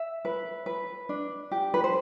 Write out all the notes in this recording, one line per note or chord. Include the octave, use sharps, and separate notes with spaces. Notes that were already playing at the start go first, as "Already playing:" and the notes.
Already playing: E5
B4
B4
D4
G4
B4
C5